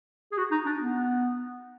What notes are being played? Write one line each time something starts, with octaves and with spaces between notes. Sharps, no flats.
G#4
F#4
D#4
D4
B3